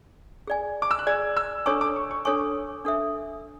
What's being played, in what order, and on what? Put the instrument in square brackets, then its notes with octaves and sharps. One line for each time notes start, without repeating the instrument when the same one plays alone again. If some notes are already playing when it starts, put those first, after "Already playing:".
[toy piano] G#4 D5 G#5
[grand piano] D6
E6
F#6
[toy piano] G#4 D5 G#5 [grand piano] G#6
[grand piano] E6
[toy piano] D4 A4 C#5 G#5 C#6 [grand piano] D6
[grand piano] D6
C#6
C#6
[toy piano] D4 A4 C#5 G#5 C#6 [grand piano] D6
[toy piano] D4 A4 E5